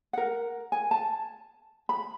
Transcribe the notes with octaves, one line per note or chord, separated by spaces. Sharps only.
A#4 F#5
G#5
A5
B5